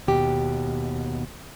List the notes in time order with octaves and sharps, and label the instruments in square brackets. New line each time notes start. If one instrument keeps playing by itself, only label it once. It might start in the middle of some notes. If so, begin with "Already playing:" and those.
[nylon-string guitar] D#2 B2 G4